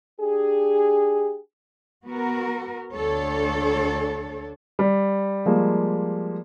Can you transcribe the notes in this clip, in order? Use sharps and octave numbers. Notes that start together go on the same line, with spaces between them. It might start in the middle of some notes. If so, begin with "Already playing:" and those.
D4 G4 G#4
B3 F#4 A#4
D2 D4 A4 C#5
G3
F3 G3 G#3 A#3